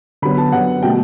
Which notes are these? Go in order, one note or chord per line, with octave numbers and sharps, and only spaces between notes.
D3 F#3 B3 B5
A5
D3 F#3 B3 F#5
B2 F#3 A3 G5